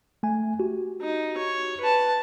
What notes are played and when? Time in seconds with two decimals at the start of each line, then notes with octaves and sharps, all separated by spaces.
0.23 A3 G#5
0.60 F#4 G4
1.01 D#4
1.37 C#5
1.81 B4 A5